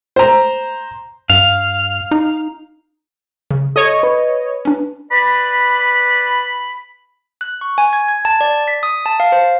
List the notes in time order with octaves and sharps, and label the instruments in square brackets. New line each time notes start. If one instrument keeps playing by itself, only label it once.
[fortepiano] C5 A#5
[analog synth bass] G2 [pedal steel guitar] F5
[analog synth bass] D#4
[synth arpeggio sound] C#3
[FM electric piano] A4 [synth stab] C#5 D#5
[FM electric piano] B4
[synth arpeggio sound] C#4 D4
[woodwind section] B4 D5 B5
[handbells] F#6
C#6
G#5
G#6
G#6
A5
D5
B6
D#6
A5
F5
C5